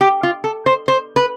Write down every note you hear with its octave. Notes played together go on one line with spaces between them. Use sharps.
G4
F4
A4
C5
C5
B4